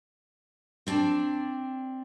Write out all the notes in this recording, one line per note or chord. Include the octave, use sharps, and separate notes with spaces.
C4 D4 D5 A5